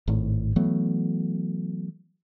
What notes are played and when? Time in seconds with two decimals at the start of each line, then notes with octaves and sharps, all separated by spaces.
0.08 G#1 A2
0.56 E3 F#3 A3 B3